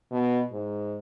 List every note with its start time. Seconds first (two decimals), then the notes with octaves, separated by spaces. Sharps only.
0.11 B2
0.52 G#2